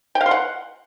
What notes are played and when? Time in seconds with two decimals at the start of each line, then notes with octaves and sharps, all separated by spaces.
0.15 G5
0.21 F5
0.26 C6
0.31 F#5